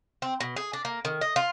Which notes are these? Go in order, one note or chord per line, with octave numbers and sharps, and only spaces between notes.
C4
B2
G#4
D4
A#3
D#3
D#5
F4